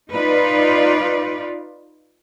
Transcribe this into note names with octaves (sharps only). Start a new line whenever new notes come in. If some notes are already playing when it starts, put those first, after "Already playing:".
D#4 F4 B4 D5